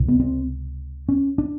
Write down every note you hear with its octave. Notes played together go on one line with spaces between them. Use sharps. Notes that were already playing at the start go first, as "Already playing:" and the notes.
Already playing: C#2 C3
B3
C4
C#4
D4